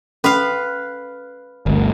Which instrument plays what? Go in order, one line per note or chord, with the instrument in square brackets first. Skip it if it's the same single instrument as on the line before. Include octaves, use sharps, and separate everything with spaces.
[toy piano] C#4 A4 C6 [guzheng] B4 F5
[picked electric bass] G1 D2